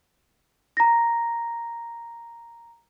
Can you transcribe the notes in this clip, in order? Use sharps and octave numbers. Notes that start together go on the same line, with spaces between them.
A#5 A#6